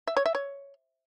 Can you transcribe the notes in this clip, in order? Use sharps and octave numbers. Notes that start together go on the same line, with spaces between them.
E5
C#5
E5
C#5